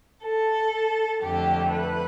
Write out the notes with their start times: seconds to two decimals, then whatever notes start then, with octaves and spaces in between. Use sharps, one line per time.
0.22 A4
1.22 F2 D3 A3 G4
1.72 B4